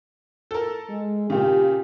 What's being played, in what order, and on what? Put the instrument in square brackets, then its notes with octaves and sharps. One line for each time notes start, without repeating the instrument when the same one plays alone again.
[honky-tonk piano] A4 A#4
[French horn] G#3
[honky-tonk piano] A#2 C#3 [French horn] G4